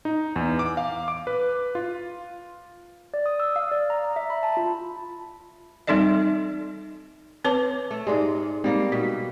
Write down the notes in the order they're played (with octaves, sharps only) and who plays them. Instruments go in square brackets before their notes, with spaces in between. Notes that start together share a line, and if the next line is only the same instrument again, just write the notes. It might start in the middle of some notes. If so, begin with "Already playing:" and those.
[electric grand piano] D#4
E2
D6
F5
D6
B4
F4
[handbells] D5
D#6
E6
F5
D5
A#5
A#5
E5
B5
A5
F4
[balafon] G3 C4 D#4 A4 D5 D#5
C4 B4 C#5 A5 D6
[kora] A3
[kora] G#2 G#3 [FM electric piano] G4 D5
[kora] G3 A#3 [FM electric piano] G#3 C4 D#4
[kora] B2 [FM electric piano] B6